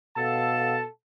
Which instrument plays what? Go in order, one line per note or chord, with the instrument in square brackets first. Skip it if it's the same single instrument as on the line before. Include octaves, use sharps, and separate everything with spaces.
[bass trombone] B2 [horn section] A4 A5 [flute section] F5 F#5 E6